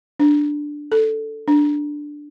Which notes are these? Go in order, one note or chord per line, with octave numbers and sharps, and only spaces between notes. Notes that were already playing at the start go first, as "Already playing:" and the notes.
D4
A4
D4